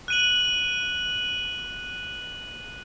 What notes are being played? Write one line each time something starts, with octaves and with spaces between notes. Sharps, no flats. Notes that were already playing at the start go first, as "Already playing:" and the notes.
F#6 D#7 F#7